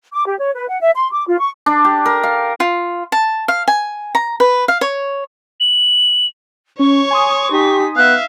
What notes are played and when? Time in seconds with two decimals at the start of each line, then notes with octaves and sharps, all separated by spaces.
0.13 D6
0.26 G4
0.39 C#5
0.55 B4
0.68 F#5
0.81 E5
0.95 C6
1.12 D6
1.28 F4
1.39 C#6
1.66 D4
1.85 G4
2.05 A#4
2.23 F5
2.60 F4
3.12 A5
3.48 F5
3.68 G#5
4.15 A#5
4.40 B4
4.68 F5
4.81 C#5
5.60 F#7
6.79 C#4 C#5 C#6
7.11 G#5 C6 D#6
7.52 D#4 G4 B6
7.97 B3 E5 F5 F#6